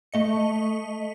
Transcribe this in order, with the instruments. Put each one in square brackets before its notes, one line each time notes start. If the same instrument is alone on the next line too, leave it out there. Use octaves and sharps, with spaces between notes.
[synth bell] A3 D#5 C#7